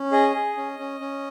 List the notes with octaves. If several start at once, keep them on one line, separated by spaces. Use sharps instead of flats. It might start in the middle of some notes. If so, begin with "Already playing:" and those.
Already playing: C#4
G#4 D#5
G#4
C#4
C#4
C#4